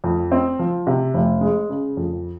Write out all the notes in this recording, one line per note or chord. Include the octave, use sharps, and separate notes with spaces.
F2
C4
F3
C3
F1
G#3
C#3
F2